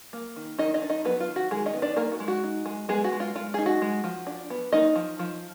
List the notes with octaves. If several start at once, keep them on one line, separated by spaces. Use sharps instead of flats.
A#3
D#3
D#3 D#4 D#5
D#4 D#5
D4
D#4 D#5
F#3 B3 B4
F4
D#3
F#4
D#3 G#3 G#4
D#4 D#5
B3
D4 D5
A#3 D#4 A#4
F#4
G#3
F#4
D#4
G#3
G#3 B3 G#4
F#4
G#3
F4
G#3 F4
D#4 G#4
F#4
G#3
F3
D4
B3
A#3 D#4 D#5
F3
F3